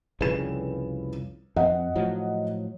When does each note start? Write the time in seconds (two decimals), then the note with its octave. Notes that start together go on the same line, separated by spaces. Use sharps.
0.21 C2 F2 C#3 B4 E7
1.56 F2 C4 D#5 F#5
1.96 A2 F3 F#3